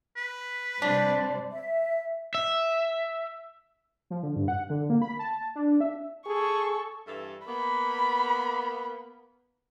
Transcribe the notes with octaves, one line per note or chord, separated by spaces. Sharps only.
B4
C3 G3 D4 C5 D5
E5
E5
F3
D3
G2
F#5
D3
A#3
B5
A5
D4
E5
G#4 A4 C#6
G2 E3 A4
A#3 B3 B5